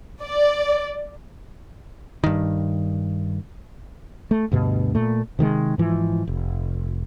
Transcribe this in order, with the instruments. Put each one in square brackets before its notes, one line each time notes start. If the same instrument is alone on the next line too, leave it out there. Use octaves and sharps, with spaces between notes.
[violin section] D5
[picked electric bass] G2 D#3
[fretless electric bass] A3
D2 G2 B2
A#2 A3
C3 D#3 F#3 G#3
G#2 E3 F3
F1